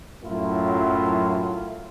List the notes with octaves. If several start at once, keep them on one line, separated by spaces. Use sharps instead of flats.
F#2 A2 F#3 E4 F4